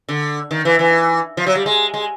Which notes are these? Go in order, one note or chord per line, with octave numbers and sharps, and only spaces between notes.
D3
D#3
E3
E3
F3
F#3
G3
G#3
G#3